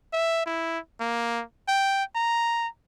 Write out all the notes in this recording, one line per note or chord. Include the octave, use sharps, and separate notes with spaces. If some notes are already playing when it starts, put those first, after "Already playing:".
E5
E4
A#3
G5
A#5